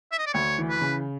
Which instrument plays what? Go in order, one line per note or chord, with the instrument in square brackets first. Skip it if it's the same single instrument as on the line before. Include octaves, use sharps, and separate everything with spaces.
[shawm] E5
D#5
D5
[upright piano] D2 [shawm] C#5
[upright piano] E3
[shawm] B4
[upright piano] C#3